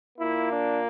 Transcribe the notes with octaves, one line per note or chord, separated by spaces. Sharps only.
A#2 A#3 E4
D4